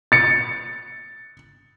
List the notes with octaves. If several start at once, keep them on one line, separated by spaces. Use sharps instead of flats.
A6 C#7